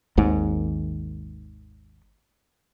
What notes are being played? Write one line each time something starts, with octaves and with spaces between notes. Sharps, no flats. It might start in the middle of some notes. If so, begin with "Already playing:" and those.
G#1 D#2 G#2